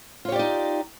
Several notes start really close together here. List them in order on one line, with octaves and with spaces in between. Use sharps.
F4 C#5 G4 D5 D#4